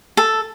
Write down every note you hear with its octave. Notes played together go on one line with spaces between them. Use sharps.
A4